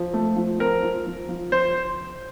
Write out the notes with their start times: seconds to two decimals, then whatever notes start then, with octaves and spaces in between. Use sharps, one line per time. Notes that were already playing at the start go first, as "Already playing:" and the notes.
Already playing: F3
0.14 A3
0.36 F3
0.59 C4 A#4
0.82 F3
1.06 F3
1.29 F3
1.52 F3 C5